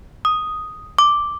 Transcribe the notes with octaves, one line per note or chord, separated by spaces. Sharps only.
D#6
D6